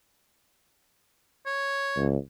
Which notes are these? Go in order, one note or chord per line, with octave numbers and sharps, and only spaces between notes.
C#5
C#2